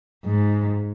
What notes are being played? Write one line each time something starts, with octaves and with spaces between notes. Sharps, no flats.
G#2